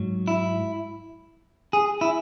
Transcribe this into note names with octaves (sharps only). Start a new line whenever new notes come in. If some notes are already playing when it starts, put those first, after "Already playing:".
Already playing: G#2 F#3
E4
G#4
E4